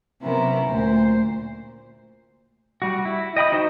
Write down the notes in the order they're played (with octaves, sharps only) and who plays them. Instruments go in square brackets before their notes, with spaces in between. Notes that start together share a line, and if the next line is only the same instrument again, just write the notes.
[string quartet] C3 F#3 B3 C#4 E4 A#4
D2 A#2 C5
[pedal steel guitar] G3 F#4
E4
D#5 G5 B5 D#6
D#4 F#4 C5 D#5